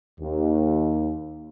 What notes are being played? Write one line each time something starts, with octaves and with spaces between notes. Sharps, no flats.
D#2